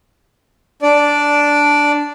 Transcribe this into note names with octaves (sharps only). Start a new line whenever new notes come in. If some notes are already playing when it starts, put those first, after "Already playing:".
D4 D5